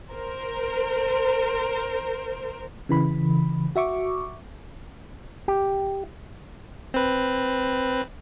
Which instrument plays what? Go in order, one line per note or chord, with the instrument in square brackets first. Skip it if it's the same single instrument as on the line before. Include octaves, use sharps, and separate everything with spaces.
[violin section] A#4 C5
[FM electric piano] C#3 E3 B5
F#4 E5 C#6 D6
[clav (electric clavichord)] G4
[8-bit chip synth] C4 B4